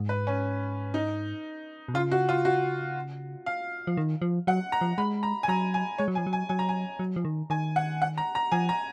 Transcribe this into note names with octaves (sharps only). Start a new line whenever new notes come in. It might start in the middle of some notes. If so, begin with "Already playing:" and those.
Already playing: G#2
B4
C#4
D#4
B2
C#3 F4
F#4
F4
F#4
F5
F3
D#3
F3
F#3 F#5
A#5
F3
G#3 B5
A#5
G#5
F#3 A#5
G#5
G#3 C#5
F#3
F3 G#5
F#3
G#5
F#3 G#5
A#5
G#5
F#3
F3
D#3
D#3 G#5
F#5
F#5
A#5
A#5
F3 G#5
A#5